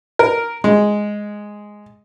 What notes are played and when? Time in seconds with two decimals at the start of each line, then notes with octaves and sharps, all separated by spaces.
0.19 A#4
0.64 G#3